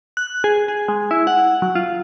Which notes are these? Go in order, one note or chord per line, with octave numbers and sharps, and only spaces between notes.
F#6
G#4
G#4
G#3
E4
F#5
F#3
F4